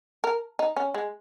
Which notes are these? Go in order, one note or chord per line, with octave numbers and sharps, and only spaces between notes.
A#4
D#4
C#4
G#3